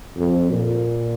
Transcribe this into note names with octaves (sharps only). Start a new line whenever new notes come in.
F2
A#2